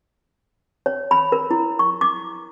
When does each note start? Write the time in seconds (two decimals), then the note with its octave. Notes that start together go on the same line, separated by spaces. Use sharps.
0.86 C#5
1.11 B5
1.32 A#4
1.51 E4
1.79 C#6
2.01 D6